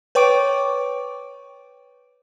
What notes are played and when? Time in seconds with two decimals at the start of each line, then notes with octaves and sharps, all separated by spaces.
0.15 B4 C#5 G5 C#6 D6 D7